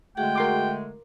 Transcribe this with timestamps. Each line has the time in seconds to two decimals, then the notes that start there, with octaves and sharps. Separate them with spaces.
0.17 D3 G#3 A3 F#4 G#4 F#5 G5
0.35 A#4 C6 D6